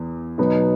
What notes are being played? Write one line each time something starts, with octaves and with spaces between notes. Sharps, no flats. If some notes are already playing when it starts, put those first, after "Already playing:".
Already playing: E2
B2 F#3 B3 D#4